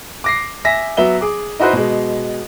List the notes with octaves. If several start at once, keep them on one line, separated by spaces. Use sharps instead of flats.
D6 A#6 C7
E5 G#5 A#6 B6
F#3 B3 E5 G7
G#4 D6
D#4 E4 F#4 B4 C5
B2 G#3